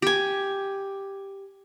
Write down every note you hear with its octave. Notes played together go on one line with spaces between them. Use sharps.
G4 G#5